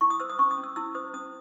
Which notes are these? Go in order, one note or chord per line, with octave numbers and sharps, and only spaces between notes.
E4 C#6
D#6
C5 E6
D#6
C#4 C#6
D#6
C#4
E6
E4 E6
C5 D#6
C#4 D#6